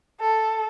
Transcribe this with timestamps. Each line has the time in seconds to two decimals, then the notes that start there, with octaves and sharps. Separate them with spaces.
0.21 A4